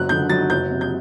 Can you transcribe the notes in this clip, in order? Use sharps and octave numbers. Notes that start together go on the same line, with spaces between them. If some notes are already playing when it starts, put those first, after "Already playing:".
Already playing: F#1 F#3 F#6
D3 G6
F#3 A6
F#1 G6
C3
G6